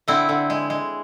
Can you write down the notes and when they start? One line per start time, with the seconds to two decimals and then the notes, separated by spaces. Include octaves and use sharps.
0.08 D3 C4 E4
0.29 D3
0.50 G#3
0.70 G#3